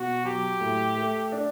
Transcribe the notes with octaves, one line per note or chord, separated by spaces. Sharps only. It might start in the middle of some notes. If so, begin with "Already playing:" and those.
Already playing: B2 F#4
F#3 G4
A2
A3
D4